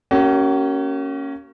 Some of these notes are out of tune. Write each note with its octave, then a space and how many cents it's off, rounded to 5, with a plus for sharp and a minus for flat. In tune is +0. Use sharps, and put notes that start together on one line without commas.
A#3 -15 C#4 +0 F#4 +45